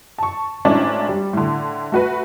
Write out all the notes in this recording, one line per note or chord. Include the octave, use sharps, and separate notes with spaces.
A5 C#6
G#1 A2 A3 C#4 D4
G3
A2 D3
A3 F#4 B4